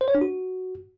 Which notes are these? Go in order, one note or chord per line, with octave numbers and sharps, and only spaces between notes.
C5
C#5
D4
F#4